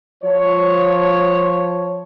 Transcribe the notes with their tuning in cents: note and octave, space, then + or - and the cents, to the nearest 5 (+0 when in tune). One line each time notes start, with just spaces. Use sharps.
F3 +10 C#5 +0